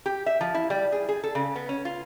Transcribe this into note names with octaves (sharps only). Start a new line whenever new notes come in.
G4
E5
F3
E4
G3
G#4
G#4
A4
C#3
B3
C#4
F4